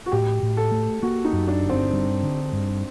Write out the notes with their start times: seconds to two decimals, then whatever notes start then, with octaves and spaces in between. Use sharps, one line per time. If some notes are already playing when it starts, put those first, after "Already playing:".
0.06 F#4
0.12 A2 G4
0.43 A2
0.57 A4
0.72 A3
1.02 A#3 F#4
1.25 D#4
1.33 F#2
1.48 D4
1.63 G1
1.69 C4
1.93 G2
2.23 D3
2.52 G2